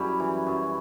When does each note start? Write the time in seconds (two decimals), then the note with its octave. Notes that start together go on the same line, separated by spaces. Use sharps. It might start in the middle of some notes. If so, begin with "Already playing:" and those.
Already playing: F#2 G3 E4
0.20 E3
0.46 F#2